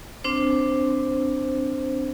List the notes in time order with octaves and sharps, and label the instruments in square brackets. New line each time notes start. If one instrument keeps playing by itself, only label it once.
[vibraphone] C4 D4 C5